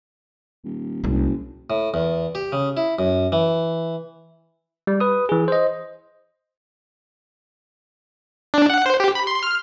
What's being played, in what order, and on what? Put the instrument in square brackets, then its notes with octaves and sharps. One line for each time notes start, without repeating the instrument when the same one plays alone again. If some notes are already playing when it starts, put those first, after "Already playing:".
[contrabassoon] D#1
[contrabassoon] F#1 [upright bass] C2 D4
[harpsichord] A2
E2
G4
C#3
E4
F#2
E3
[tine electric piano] G3
B4 D#6
E3 G#4
C5 D#5
[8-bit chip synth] D4
F#5
C5
G4
B5
C6
F6